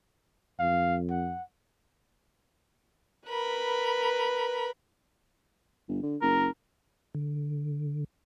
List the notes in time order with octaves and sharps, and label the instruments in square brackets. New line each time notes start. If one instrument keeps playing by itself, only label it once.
[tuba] F2 [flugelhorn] F5
[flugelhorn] F#5
[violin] A#4 B5 [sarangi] B4
[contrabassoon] G1
D3
[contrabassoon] F#1 [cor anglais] A#4
[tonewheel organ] D3